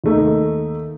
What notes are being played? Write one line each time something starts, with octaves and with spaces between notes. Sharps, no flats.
D#2 A3 D#4